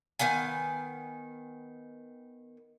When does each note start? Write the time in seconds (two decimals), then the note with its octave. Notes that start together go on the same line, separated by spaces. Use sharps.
0.19 D#3 B3 F5 G#5